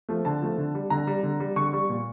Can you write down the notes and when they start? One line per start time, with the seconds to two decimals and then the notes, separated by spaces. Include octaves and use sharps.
0.09 F3 A3
0.25 D3 A5
0.42 F3 A3
0.58 D3
0.75 G3
0.90 D3 A#5
1.07 G3
1.23 D3
1.40 G3
1.56 D3 C#6
1.73 G3
1.89 A#2